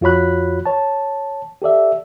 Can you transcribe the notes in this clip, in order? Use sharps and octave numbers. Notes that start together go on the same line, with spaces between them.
F2 F4 F#4 C#5 B5 F#6
C#5 A5
G4 A4 D5 E5